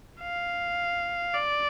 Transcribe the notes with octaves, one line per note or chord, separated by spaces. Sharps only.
F5
D5